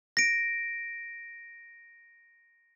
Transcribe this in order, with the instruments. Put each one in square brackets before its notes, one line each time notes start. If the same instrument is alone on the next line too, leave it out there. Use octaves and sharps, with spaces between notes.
[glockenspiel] A#6 D7